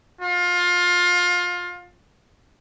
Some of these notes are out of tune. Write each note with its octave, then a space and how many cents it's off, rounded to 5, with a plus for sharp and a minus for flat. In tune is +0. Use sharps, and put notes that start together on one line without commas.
F4 +25